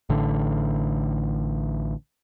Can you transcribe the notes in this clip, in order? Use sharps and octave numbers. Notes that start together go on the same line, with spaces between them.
A1 A2 D3